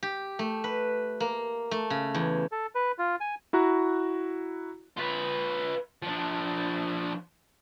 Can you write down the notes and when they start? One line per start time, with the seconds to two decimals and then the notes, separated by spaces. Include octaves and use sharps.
0.03 G4
0.39 A3
0.64 B4
1.20 A#3
1.71 A3
1.90 C#3
2.14 E2
2.52 A4
2.75 B4
2.98 F4
3.20 G#5
3.53 E4 F#4 A#5 F#6
4.97 F4 B4
6.02 F3 D4